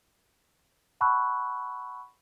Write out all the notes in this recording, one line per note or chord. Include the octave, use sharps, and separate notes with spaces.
F#5 A5 B5 C#6 E6 F#6